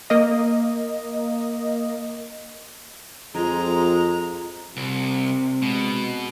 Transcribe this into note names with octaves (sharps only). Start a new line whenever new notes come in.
A#3 D#5
F2 F3 G#3 F4 A#5
C2 C3
B2 G#3